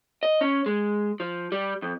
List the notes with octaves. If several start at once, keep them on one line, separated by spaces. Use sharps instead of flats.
D#5
C#4
G#3
F3
G3
F2